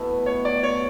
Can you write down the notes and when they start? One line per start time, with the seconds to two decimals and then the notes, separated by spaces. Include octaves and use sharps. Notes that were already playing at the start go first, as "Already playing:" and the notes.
Already playing: B2 A3 E4 B4
0.26 C#5
0.45 D5
0.63 C#5